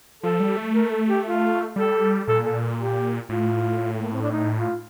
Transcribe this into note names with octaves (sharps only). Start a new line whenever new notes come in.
F3 A4
G3
A3
A#4
A4
G4
F4
G3 A4
A#2 A4
A4
G4
A2 F4
A3
A#3
C4
D4
D#4
F4